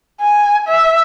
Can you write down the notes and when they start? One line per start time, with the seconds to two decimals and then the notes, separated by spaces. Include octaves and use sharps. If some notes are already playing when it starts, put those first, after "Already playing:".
0.21 G#5
0.68 E5